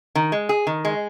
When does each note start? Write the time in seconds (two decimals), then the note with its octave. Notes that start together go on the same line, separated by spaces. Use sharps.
0.15 D#3
0.32 G#3
0.49 G#4
0.67 D#3
0.85 G#3